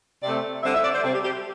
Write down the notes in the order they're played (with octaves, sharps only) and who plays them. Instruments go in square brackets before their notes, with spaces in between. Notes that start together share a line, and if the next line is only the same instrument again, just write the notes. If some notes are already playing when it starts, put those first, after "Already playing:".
[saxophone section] C3 A3 C4 D5
D3 G3 C4 E5
E5
D5
C5
C3 G3 C4 A4
G4
G4